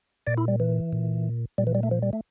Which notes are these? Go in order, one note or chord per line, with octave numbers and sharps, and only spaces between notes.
A#2 D5
E4
G3
E3
A#2
A#2 G3
E3
G3
A3
F3
G3
A3